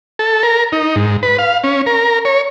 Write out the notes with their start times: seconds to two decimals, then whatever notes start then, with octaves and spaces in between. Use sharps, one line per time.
0.19 A4
0.43 A#4
0.72 D#4
0.96 G#2
1.23 B4
1.38 F5
1.64 C#4
1.86 A#4
2.25 C#5